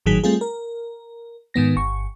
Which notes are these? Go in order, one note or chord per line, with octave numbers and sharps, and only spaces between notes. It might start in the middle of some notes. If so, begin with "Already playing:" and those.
G#1 A2 D#3 F#3 G#4 B6
G3 A3 C4 F4 G#4
A#4
G#2 D#3 B3 A#6
G1 C#6